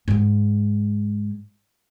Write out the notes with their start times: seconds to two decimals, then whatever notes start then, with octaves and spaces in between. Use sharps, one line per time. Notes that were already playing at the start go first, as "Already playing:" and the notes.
0.08 G#2 G#3